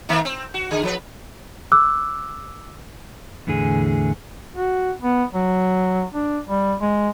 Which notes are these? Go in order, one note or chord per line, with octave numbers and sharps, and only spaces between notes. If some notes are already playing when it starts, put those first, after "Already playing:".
D#3 A#3 C4
C4
F#4
D3 G#4
F3 A4 B4
D6 E6 F#6
E2 A2 D3 G#4 G#5
F#4
B3
F#3
D4
G3
G#3